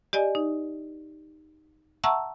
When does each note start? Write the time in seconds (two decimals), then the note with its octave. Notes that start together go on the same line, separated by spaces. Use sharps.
0.13 G4 D5 D#5 G#5
0.35 D#4
2.04 E5 F#5 A5 A#5 C#6 E6